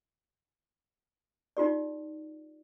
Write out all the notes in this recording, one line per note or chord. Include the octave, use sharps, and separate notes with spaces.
D#4 F4 G4 D5